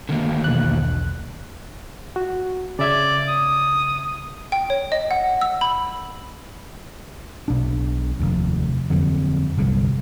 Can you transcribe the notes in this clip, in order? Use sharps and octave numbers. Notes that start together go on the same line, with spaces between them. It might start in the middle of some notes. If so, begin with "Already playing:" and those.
D3 D#3 A#3
B1 E2 F#6
F#4
C#3 D5 E5 G#6
D#6
G5
C#5
D#5
F#5
E6
B5
B1 D4
F1 D#2
F2 D3 F#3
G1 C2 D3 F#3